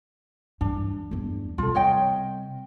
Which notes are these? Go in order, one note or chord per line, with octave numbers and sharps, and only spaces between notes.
G2 E3 D4
E2 G2
C3 G3 F4 A4
C#5 D#5 G5